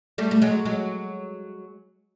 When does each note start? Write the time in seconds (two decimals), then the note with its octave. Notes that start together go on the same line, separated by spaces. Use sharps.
0.18 G3 A3
0.31 A3
0.42 F#3 G#3
0.65 F#3 G#3